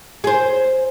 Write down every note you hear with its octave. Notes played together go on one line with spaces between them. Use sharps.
G#4 C5